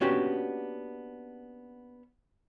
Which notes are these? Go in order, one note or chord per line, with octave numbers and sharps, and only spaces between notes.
A#3 B3 C#4 D4 F#4 G4